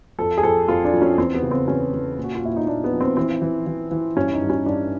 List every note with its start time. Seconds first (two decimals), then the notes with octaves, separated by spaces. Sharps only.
0.19 F2 A4
0.38 G#4
0.43 F2 A4
0.68 F2 F4
0.85 D4
0.93 F3
1.02 C#4
1.18 E2 C4
1.35 B3
1.43 C#3
1.51 C4
1.68 E2 C#4
1.93 E2
2.18 A#2
2.24 F#4
2.35 F4
2.43 A#2 E4
2.56 D#4
2.67 A#2 D4
2.84 B3
2.92 F3
3.01 C4
3.17 E3 C4
3.42 E3
3.67 E3
3.91 E3
4.17 G2 C#4
4.33 D#4
4.41 G2
4.50 C#4
4.66 G2 D4